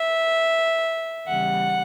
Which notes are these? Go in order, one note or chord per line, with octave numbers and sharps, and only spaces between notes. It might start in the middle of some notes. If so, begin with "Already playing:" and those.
Already playing: E5
E2 C#3 G3 F#5